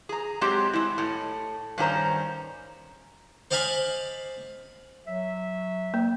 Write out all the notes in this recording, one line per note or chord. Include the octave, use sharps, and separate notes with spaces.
G#4 A#5
F#3 G#3 C4 G4
G#3 E4
A2
G2 D#3 C#4 G4 C5 A#5
C5 D5 D#5 F5 G#5 B5
F#3 E5
A#3